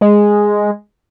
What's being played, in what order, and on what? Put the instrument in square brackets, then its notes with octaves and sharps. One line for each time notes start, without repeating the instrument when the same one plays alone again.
[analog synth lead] G#3